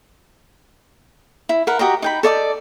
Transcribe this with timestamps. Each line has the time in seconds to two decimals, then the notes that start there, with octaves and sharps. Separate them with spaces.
1.49 E4
1.67 A#4 B4 F#5
1.79 F#4 G4 D#5 A#5
2.02 D#4 G5 B5
2.23 A4 D5 D#5 D6